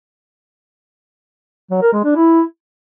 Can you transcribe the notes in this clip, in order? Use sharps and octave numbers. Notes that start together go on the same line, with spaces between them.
F#3
A#4
G#3
D4
E4